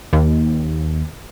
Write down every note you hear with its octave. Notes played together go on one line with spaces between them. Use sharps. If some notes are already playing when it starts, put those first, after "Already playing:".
D#2